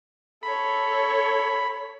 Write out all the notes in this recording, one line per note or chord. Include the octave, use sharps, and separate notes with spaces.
A4 C#5 B5